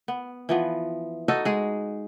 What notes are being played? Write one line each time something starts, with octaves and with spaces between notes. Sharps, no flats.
B3
E3 F3 B3
D#4 F#4 A4 D#5
G#3 F#4 G#4